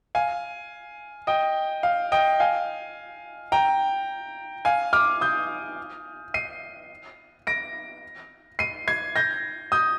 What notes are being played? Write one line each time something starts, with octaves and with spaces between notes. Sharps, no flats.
F5 G#5
D#5 G5
F5
D#5 G5
F5 G#5
G5 A#5
F5 G#5
D6 F6
D#6 G6
C7 D#7
A#6 D7
C7 D#7
G#6 C7
G6 A#6
D#6 G6